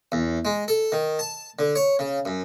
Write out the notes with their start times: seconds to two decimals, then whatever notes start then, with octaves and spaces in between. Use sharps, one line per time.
0.12 E2
0.45 G#3
0.68 A4
0.92 D#3
1.19 A5
1.59 D3
1.76 C#5
1.99 C#3
2.25 F#2